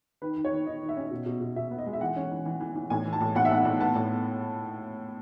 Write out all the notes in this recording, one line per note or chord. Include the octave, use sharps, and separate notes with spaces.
D#3 B4
D#3
C#5
D#3
D#3 D#5
D#3
E5
C#4
B2
B2
B2
B2 E5
B3
D#5
G#3
E5
E3 F#5
C#4
E3
E3
E3
E3
A2 G#5
E3
A5
A2
A2 F#5
E5
A2 F#5
A2
B3 A5
A2